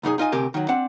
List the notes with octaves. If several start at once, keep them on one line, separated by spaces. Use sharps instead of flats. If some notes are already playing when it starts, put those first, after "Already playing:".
C2 F#2 D#4 G#4
D#4 F4 D#5 G#5
D2 C3 C4 G4 A#4 G#5
D#3 F#3
C4 D4 F#5